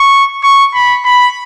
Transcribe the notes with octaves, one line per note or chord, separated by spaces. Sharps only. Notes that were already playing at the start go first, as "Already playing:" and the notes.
Already playing: C#6
C#6
B5
B5